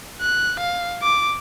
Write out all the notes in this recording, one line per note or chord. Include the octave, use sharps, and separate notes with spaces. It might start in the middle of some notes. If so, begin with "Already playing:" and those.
F#6
F5
D6